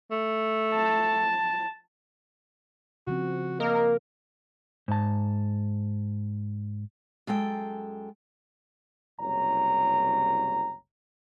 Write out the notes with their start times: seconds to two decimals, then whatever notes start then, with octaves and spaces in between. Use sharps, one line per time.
0.11 A3
0.74 A5
3.07 C#3 F3 C4 F#4
3.60 A#3 A#4 D#5
4.88 G#2 A5
7.27 F#2 G#3 A4 G5
9.20 F#1 C2 C#5 A#5